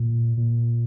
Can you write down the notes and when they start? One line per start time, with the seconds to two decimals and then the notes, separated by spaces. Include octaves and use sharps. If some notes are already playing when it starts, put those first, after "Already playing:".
Already playing: A#2
0.37 A#2